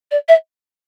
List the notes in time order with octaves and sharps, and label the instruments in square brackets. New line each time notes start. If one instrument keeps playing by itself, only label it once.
[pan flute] D5
E5